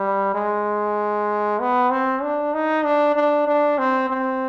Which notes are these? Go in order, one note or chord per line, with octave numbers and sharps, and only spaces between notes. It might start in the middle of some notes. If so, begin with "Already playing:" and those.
Already playing: G3
G#3
B3
C4
D4
D#4
D4
D4
D4
C4
C4